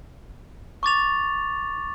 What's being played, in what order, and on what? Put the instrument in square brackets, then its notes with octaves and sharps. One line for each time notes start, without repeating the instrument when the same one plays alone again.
[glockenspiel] C#6 D6 A6 F7